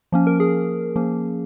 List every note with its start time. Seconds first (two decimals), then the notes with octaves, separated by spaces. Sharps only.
0.12 F3 A#3 C#4
0.27 A#4
0.40 G#4
0.96 F3 A#3 C#4